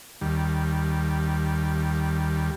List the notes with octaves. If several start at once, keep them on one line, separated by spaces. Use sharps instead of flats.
D#2 G3